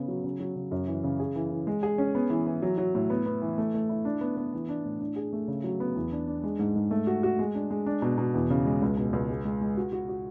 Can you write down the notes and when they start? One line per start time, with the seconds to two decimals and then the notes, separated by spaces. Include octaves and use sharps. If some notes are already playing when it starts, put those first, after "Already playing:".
Already playing: C#3 B3
0.08 F#3
0.24 C#3
0.40 F#3
0.56 C#3
0.71 F#2
0.87 E3
1.04 C#3
1.20 G#4
1.35 E3
1.51 E3
1.67 G#3
1.83 G#4
1.98 C#4
2.15 B3
2.30 E3
2.47 E3
2.62 F#3
2.78 F#3
2.95 A2
3.10 B3
3.26 B3
3.42 E3
3.58 A3
3.74 A3
3.89 E4
4.05 D4
4.21 B3
4.37 B3
4.53 E3
4.69 D4
4.85 A2
5.00 D4
5.16 G#4
5.33 A3
5.48 C#3
5.64 F#3
5.80 B3
5.96 E2
6.12 D4
6.27 D4
6.44 G#3
6.59 G#2
6.76 G#2
6.91 A3
7.07 F#4
7.23 F#4
7.39 G#3
7.55 D4
7.71 G#3
7.86 D4
8.02 B2
8.18 B2
8.34 E2
8.50 C#3
8.66 G#3
8.82 C#2
8.97 B2
9.13 C#2
9.29 G#3
9.45 G#3
9.61 G#3
9.77 F#4
9.93 F#4
10.09 F#4